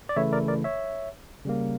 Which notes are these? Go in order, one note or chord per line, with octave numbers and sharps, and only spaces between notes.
D5
C#3 E3 A3 E4 C#5 E5
A#4 D5
A#4 D5
C#5 E5
C#3 G3 A#3